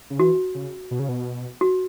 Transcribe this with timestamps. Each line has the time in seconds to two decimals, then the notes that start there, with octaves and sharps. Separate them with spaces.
0.10 C#3
0.19 E3 F#4
0.55 C#3
0.91 B2
0.99 C#3
1.09 B2
1.61 F#4